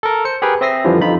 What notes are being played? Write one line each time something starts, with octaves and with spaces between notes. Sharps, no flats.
A4 A#4
C5 C#7
G4 G#4 A#4 B4 G5
C4 E5 D#6 A#6 C7
F2 D3 E3 F3 G3
F2 D#4 F4 B5